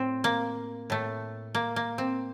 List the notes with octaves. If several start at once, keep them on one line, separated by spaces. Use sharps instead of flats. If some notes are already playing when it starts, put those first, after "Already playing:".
Already playing: A2 C4
A#3
A2 A3
A#3
A#3
C4